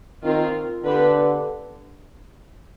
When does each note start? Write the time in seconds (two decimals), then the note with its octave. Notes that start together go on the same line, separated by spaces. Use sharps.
0.23 D#3 C4 F4 A#4
0.84 D3 B3 D4 G4 B4